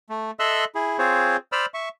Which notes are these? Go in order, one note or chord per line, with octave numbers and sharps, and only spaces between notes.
A3
A4 D#5 E5 C6 E6 F#6
E4 G#4
C4 F4 G#4 C5 C#5
C5 D5 B5 E6 F6
E5 C#6